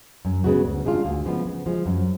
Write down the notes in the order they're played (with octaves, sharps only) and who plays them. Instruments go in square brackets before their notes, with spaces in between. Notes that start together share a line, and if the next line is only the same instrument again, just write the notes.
[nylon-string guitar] F#2
C#3 G#3 B3 F#4
D2
C#3 G#3 D4 F4
D2
C#3 F3 G#3 B3
C#3
F3 G#3
F#2